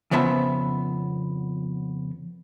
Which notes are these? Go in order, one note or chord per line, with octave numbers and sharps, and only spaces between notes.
F2 C#3 F3 B3 E5 A5